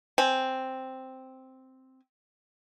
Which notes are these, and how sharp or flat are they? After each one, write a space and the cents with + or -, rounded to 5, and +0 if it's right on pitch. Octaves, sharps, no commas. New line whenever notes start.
C4 +0 G#5 +0